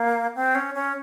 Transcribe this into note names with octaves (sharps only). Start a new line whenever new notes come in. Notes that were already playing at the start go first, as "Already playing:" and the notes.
Already playing: A#3
C4
C#4
C#4